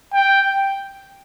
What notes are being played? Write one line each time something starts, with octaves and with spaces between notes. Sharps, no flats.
G5